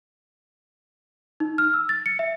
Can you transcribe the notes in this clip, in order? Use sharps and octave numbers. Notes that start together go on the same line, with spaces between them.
D#4
F6
E6
A6
C#7
E5